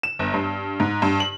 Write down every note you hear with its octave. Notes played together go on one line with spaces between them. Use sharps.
E7
G1
G2
G#2
G2
F#7